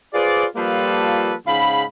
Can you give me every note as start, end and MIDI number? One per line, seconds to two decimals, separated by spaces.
0.14 0.46 65
0.14 0.46 68
0.14 0.46 71
0.14 0.46 72
0.14 0.46 74
0.56 1.34 53
0.56 1.34 55
0.56 1.34 58
0.56 1.34 65
0.56 1.34 69
0.56 1.34 71
1.47 1.83 44
1.47 1.83 49
1.47 1.83 77
1.47 1.83 83